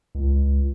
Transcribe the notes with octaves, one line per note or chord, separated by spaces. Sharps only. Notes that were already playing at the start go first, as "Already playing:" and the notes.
C#2